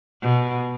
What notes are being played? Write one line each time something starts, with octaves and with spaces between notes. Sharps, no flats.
B2